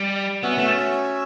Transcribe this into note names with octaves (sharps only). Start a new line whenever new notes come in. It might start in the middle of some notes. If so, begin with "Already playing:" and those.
Already playing: G3
B3 C#4 F#4 C#5 E5
A3